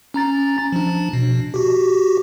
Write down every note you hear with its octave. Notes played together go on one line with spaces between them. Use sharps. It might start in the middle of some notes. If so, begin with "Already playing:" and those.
C#4 A#5 A6
F3 D4
B2
F#4 G4